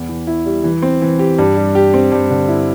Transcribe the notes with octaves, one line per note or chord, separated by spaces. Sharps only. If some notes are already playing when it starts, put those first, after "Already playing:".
Already playing: E2
E3
E4
G3
E3
C4
E3
G4
G2
G3
G4
C4
G2
D3
E4